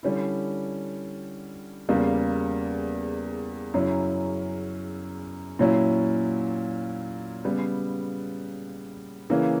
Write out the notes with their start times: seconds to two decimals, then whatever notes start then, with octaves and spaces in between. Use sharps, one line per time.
0.03 D3 G3 C#4 E4
1.89 E2 C#3 G3 A#3
3.74 F#2 C#3 F#3 C#4 E4
5.59 A#2 F#3 C#4 E4
7.44 C#3 G3 B3
9.30 C#3 E3 A#3 C#4